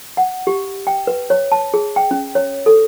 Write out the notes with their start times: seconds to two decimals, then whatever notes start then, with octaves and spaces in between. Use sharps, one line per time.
0.17 F#5
0.47 G4
0.87 G5
1.07 B4
1.30 C#5
1.52 A5
1.74 G#4
1.96 G5
2.11 C#4
2.35 C#5
2.66 A4